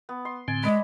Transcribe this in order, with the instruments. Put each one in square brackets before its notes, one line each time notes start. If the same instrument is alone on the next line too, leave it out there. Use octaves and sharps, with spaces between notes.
[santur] B3
C6
[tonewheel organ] A2 D3 C4 [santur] G#5
[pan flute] G#3 [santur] D5 D#5 B5